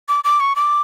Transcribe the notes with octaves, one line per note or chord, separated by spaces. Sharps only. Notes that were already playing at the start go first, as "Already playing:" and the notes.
D6
D6
C#6
D6